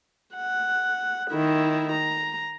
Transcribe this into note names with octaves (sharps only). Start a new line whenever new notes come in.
F#5
D#3 E4
A#5